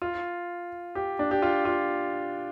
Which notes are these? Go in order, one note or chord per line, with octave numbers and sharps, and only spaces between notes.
F4
G4
D4
G4
F4
F4